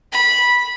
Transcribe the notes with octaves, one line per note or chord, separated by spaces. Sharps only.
B5